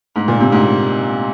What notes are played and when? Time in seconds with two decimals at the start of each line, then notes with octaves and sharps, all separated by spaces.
0.16 G#2
0.28 A#2
0.40 C3
0.52 G#2